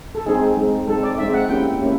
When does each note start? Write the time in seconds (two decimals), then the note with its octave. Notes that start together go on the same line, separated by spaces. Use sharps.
0.15 A4
0.26 G#3 C4 D#4 G#4
0.57 G#3 C4 D#4
0.87 G#3 C4 D#4 A4
1.03 D5
1.18 G#3 C4 D#4 E5
1.34 F#5
1.49 A#3 C#4 E4 G4 G5
1.80 A#3 C#4 E4 G4